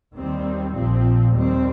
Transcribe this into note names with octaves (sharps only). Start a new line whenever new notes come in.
D#2 D#3 G3 C4
A#1 A#2 F3 C4
D#2 D#3 G3 C4